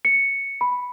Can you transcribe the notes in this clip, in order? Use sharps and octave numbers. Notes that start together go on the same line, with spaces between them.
C#7
B5